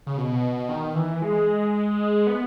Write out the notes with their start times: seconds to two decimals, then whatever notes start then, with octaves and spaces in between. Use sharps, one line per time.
0.07 C#3
0.17 B2
0.69 D#3
0.95 E3
1.22 G#3
2.27 B3